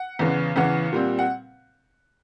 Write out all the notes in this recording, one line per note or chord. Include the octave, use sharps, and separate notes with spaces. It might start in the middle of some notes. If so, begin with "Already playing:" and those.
Already playing: F#5
E2 C#3 E3
E2 C#3 E3 F#5
A#2 G3 C4
F#5